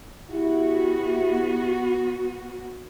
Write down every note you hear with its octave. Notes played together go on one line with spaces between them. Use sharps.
B3 E4 F#4 G4